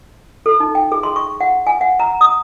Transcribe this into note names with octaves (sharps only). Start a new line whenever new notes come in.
A4
D#4
G5
G#4
C6
C#6
F#5
G#5
F#5
A#5
D#6